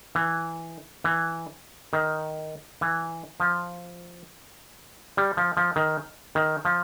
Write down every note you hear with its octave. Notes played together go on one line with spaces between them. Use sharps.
E3
E3
D#3
E3
F3
G3
F3
F3
D#3
D#3
F3